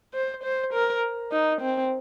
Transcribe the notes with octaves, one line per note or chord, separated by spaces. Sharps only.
C5
C5
A#4
D#4
C4